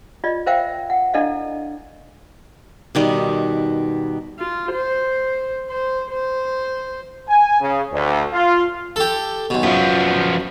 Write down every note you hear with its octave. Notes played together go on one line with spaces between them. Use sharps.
F4 D5 D#5
A#4 C5 E5 F5 G5
F#5
D4 E4 A4 D5 D#5 F5
B2 D#3 G3
F4
C5
C5
C5
G#5
C#3
D2
F4
G4 A4
B1 B2
F#2 F3 B3